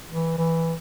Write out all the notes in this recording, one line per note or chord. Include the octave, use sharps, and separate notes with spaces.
E3
E3